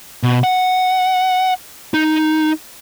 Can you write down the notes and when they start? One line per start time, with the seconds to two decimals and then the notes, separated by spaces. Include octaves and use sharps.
0.23 B2
0.44 F#5
1.94 D#4